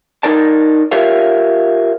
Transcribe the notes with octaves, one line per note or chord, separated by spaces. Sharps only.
D#4 A#4 D5 A5
F4 G4 A#4 C#5 E5 F5